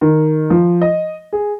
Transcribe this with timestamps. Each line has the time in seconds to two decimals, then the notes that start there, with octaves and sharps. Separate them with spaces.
0.01 D#3
0.50 F3
0.81 D#5
1.33 G#4